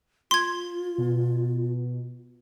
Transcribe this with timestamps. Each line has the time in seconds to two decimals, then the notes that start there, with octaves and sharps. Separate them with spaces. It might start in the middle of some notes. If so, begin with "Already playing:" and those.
0.31 F4 C6 G#6
0.98 B2